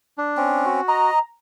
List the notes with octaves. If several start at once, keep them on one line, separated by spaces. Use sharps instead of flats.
D4
C4 C#4
F#4
D#5 A#5